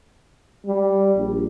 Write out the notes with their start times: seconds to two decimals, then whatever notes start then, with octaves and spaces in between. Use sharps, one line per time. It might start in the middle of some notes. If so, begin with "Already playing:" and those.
0.66 G3
1.16 A#1